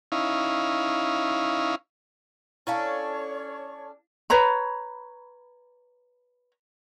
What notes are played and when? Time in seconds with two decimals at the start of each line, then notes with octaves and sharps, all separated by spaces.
0.12 C#4 D#4 E4 F5
2.67 C#4 D4 E4 A4 C#5 F5 C#6
4.30 B4 C#5 A#5 B5